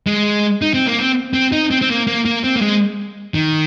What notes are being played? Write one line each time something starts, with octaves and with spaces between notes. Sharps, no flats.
G#3
D#4
C4
A#3
C4
C4
D#4
C4
C4
A#3
A#3
A#3
C4
A#3
G#3
D#3